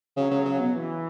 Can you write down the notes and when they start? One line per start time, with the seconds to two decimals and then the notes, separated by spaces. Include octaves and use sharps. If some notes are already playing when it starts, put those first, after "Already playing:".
0.17 C#3 F#3
0.31 C#3
0.45 C#3
0.59 B2
0.74 E3